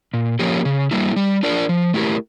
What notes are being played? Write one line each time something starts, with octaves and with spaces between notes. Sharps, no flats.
A#2
F3 A#3 C#4 G4
C#3
G3 A#3 E4
G3
D4 F4 A#4 D5
F3
A3 E4 G4 A#4